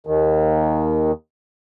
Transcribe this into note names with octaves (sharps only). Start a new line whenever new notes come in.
D#2 D#3